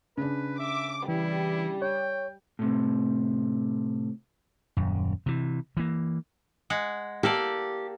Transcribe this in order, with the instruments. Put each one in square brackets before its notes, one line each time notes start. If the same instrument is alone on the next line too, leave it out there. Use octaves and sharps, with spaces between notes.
[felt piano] C#3 D4 [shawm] B4
[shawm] E5 [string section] D6
[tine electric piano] E3 [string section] G3 [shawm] E4
[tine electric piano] C#5 [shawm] G5
[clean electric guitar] A2 C3
[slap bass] D#1 F#2
C3 E3
E3 A#3
[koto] G#3 F#5
[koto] A#3 A4 D5 [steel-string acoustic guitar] G4